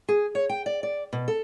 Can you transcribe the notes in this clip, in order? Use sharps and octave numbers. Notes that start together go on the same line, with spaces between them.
G#4
C#5
G5
D5
D5
B2
A4